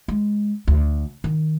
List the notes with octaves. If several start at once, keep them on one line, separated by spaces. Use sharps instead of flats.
G#3
D2
D#3